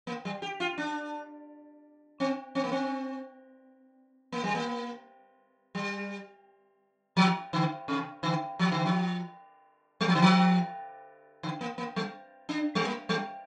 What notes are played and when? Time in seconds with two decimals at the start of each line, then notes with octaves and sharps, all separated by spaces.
0.07 A#3
0.25 G3
0.42 G4
0.60 F4
0.78 D4
2.20 C4
2.55 C4
2.64 A#3
2.72 C4
4.32 A#3
4.44 G3
4.55 A#3
5.75 G3
7.17 F3
7.53 D3
7.88 C3
8.23 D3
8.59 F3
8.72 D3
8.86 F3
10.01 G3
10.08 F3
10.15 D3
10.22 F3
11.43 D3
11.61 A#3
11.78 A#3
11.96 G3
12.49 D4
12.75 G3
12.85 A#3
13.09 G3